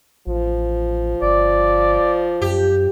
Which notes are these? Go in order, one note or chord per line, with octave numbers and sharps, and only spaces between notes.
A1 F3
G1 D5
F#2 G4